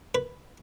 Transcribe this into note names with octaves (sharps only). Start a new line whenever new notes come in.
B4